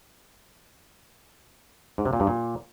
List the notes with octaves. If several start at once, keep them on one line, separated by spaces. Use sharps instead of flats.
G#2
C3
A#2
G2
A#2